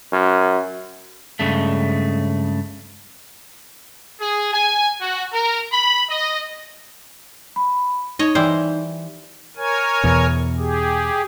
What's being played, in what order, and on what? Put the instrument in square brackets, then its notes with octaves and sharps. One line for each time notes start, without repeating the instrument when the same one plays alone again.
[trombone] F#2
[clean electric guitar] C#2 G2 C#3 A3
[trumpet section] G#4
G#5
F#4
A#4
B5
D#5
[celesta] B5
[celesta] D#4 [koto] C#5 D#5
[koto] E3 G3 C5
[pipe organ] A#4 C#5 G#5
[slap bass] E2 B2
[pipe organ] G4 G#4